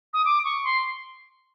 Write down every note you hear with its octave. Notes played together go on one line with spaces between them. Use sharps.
D#6
D6
C#6
C6